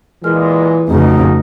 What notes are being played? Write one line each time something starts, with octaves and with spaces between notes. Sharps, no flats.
A#2 E3 G#3 A#4 G#5 F6
F2 C#3 A3 D#4 F#4 G#4 B4